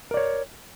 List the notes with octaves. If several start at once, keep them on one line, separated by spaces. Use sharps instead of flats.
A#4 C#5 D5